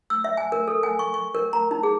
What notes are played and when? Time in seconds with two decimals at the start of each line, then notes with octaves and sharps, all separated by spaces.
0.10 E6
0.24 E5
0.37 G#5
0.52 A#4
0.68 A4
0.83 G#5
0.99 C#6
1.14 C#6
1.35 A#4
1.53 A#5
1.71 D#4
1.83 G#4